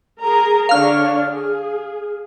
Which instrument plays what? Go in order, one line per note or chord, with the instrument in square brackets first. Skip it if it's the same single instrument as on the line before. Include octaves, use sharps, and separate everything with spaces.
[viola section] G#4 A#4 A#5
[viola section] D3 D4 C#5 [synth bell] F5 F6
[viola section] G#4